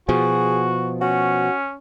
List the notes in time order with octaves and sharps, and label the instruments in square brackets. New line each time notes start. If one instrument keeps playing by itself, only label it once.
[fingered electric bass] B2 F3 [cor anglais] F#4 [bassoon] G#4
[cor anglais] C#4 [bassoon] F#4